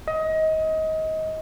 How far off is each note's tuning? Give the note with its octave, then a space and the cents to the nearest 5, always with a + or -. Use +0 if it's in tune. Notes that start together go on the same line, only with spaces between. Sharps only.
D#5 +25